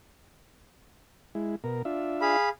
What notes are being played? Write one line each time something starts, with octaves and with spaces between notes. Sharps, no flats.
G#3 E4
B2 A#4
D4 F4 E5
G#4 F5 B5